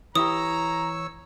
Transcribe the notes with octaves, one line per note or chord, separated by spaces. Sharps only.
E3 E4 G4 C#5 A#5 D#6 E6